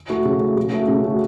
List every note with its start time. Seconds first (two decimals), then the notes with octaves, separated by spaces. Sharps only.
0.10 A3 F#4
0.25 C#3
0.41 A3 F#4
0.57 C#3
0.72 A3 F#4
0.88 C#3
1.04 A3 F#4